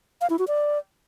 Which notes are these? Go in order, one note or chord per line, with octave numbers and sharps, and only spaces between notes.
F5
E4
F#4
D5